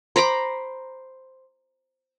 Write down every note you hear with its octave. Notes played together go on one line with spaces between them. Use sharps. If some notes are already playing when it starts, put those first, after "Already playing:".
C5 A#5 B5 D6